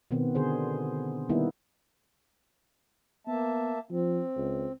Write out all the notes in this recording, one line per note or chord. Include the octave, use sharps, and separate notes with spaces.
B2 D#3 B3 C4
D3 G#4 C5
D#3 G3 A#3 B3 D#4 E4
A#3 B3 E5 A5
F3 C4
C#2